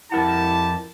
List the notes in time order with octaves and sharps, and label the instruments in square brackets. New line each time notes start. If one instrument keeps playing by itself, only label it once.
[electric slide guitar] F2 A#4 F#5 [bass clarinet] E4 [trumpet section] G4 A5